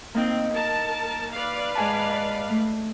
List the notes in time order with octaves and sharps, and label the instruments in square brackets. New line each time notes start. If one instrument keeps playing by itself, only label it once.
[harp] A#3 D#4 [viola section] C4
[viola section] A#4 A5
B4 D5 F5
[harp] G#2 G#5 A5
A3